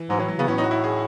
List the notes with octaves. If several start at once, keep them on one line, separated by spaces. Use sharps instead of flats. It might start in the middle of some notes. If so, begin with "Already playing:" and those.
Already playing: E3
G#2 F#3
A2 E3
F#3
C#3 B3
A2 C#4
D#4
F#4
E4
G#4